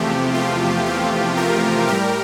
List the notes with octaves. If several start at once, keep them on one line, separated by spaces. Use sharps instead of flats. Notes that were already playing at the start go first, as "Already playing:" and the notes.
Already playing: E2 C3 F3 A3 G4
F4
G4
G4 A#4
A2 G3 G4 A#4